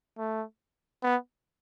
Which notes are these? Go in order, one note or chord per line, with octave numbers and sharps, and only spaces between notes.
A3
B3